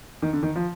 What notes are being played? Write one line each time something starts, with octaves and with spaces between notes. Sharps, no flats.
D#3
D3
D#3
F3